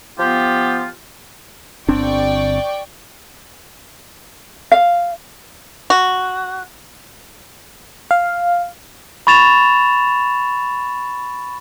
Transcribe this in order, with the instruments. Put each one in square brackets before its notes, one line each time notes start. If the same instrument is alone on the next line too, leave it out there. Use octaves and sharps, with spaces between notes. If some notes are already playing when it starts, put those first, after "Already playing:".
[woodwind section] F3 B3 F4 G4
[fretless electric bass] G1 C4 D4 [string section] D5 G5 C#6
[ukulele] F5
[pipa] F#4
[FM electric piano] F5
[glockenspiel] B5 C#6 A6 E7 F7